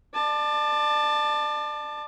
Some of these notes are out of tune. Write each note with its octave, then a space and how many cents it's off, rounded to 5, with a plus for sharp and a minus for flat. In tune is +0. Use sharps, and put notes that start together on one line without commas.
D5 +30 A5 +0